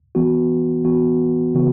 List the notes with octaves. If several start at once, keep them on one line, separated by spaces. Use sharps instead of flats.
E3 B3 F#4
E3 B3 F#4
C#3 E3 B3 F#4